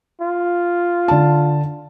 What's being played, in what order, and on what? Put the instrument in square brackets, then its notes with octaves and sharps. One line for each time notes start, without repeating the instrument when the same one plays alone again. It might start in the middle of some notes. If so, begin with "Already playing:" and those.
[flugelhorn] F4
[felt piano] D3 A5